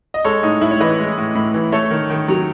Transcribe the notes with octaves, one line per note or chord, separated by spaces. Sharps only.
D#5
G#3 A4 C#5
A2 D#4
A2 E4
C#5
E3 B4 D#5
G#3
A2
A2
E3
A3 A4 C#5
D#3
D#3
F#3